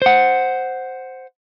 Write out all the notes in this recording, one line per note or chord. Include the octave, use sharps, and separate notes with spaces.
C5 F#5